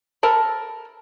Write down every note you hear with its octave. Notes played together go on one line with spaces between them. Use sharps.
A4 A#4 A5 B5